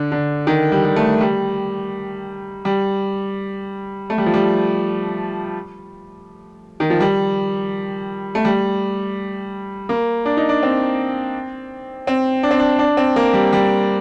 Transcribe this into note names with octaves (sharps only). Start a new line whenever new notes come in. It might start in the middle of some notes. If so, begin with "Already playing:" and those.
Already playing: D3
D3
D#3
G3
G3
A3
G3
G3
A3
G3
F3
G3
D#3
F3
G3
A3
G3
A#3
D4
D#4
D4
C4
C4
D4
C4
D4
D4
C4
A#3
G3
G3